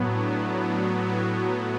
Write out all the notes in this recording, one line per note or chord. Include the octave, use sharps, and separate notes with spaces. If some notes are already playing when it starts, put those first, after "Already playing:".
Already playing: A2 F#3 B3
D4
D4
F#4